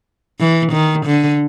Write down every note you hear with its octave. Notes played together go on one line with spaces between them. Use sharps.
E3
D#3
D3